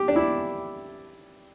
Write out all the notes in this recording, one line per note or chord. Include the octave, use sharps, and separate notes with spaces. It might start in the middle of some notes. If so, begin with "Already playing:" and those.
Already playing: G4
D4
E4